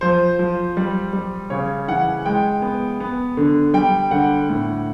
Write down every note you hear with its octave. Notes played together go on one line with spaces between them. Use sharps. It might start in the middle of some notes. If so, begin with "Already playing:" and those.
F3 C5
F3
G3
G3
C#3 C#5
E3 F#5
G#3 G5
B3
B3
D3
G3 G5
D3 F#5
A2